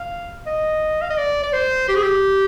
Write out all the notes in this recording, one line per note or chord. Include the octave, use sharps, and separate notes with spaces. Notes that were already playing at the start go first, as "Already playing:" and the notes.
Already playing: F5
D#5
F5
D#5
D5
D5
C5
G4
G#4
G4